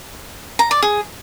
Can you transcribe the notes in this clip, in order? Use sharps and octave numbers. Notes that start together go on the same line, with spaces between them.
A#5
D5
G#4